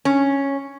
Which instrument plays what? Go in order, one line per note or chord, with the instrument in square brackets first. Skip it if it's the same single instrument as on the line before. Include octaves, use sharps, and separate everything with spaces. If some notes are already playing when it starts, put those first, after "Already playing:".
[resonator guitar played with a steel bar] C#4